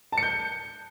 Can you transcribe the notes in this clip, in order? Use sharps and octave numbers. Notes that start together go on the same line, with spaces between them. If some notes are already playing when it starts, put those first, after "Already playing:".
A5
C#7
G6